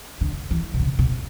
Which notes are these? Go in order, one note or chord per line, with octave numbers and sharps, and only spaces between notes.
D3
E3
B2
C#3
B2